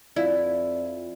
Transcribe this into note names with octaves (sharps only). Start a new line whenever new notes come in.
F2 E4 D5 F5